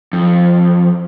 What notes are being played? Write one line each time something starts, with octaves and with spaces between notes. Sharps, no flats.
F2